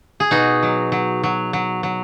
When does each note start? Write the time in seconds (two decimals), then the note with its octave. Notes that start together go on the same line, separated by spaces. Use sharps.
0.20 G#4
0.31 B2 D#4 F#4
0.63 F#3
0.92 F#3
1.23 F#3
1.53 F#3
1.83 F#3